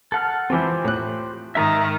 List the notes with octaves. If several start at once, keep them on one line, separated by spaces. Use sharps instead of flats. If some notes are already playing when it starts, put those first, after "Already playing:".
A4 F#5 F6
E3 C4 F4 G4 C5
A2 F#6
G#2 D#3 E5 A#5 D#6